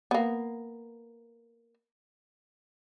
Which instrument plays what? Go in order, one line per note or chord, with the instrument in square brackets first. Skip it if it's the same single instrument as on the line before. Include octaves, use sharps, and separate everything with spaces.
[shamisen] A#3 B3